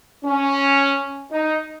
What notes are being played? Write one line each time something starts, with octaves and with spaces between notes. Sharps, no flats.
C#4
D#4